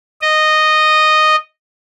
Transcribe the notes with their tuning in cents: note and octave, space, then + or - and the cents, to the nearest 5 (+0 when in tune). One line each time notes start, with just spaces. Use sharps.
D#5 -10